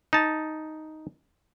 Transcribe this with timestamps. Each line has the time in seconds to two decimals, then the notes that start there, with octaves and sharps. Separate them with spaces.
0.13 D#4 A5